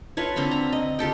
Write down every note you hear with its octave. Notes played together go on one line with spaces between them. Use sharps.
F4 A4 B4 C#5
D3 C4 F5 B5
A#5
D#5
F4 G4 A4 G5